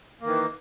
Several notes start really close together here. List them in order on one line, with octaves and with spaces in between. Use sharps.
A#3 D#3 E3